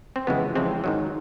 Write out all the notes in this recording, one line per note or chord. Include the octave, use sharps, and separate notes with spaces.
C4
F2 C#3 E3 G#3 B3
F2 C#3 E3 G#3 C4
G#2 D#3 F#3